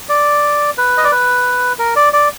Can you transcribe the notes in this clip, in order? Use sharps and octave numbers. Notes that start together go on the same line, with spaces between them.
D5
B4
D#5
D5
B4
A#4
D5
D5